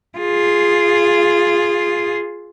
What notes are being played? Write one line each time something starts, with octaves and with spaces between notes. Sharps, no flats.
F4 G#4